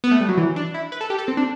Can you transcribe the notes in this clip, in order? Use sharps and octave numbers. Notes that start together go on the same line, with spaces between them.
B3
A3
G3
F#3
E3
D4
E4
B4
A4
G4
A4
C4
D4